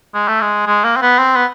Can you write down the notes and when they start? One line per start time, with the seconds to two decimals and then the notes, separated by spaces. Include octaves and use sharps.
0.14 G#3
0.28 A3
0.41 G#3
0.67 G#3
0.84 A#3
0.96 C4
1.02 B3
1.18 C4
1.35 B3